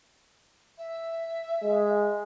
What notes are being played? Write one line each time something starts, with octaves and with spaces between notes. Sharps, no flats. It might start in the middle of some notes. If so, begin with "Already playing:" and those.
E5
G#3